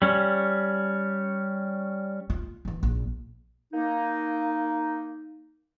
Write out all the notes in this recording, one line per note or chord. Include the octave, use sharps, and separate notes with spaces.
G3 C#4
F4
D#3 E3
A#1
A#3 D#4